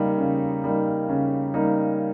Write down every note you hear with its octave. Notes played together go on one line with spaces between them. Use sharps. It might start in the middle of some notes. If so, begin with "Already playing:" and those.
Already playing: C#3 G3 A#3 D#4
C#3
G3 A#3 D#4
C#3
G3 A#3 D#4